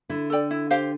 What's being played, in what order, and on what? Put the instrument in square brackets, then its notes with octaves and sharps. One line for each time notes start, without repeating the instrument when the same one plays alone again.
[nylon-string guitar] D3 [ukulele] E4
[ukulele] A4 D5 G5
E4
G4 C5 F5